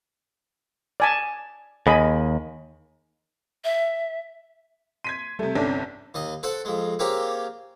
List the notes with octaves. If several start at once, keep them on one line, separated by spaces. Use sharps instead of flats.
D5 G#5 A5
D#2 G#4 D#5 B5
E5
C6 G#6 B6 D#7
C3 G3 A3 A4
G1 C2 C#4 D4 A4 D5
D#2 D#5
A4 C5 F#5
F2 G#3
A#3 C4 C#4 G4 G#4